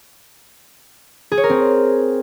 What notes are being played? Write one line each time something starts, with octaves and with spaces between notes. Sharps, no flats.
G#4
C#5
A#4
C4